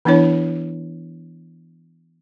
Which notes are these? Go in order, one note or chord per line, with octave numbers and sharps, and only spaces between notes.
E3 B3 D4 E4 C#5